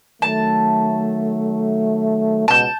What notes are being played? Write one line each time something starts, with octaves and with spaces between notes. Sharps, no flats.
D#3 F#3 A3 A5
C#2 B2 A5 G6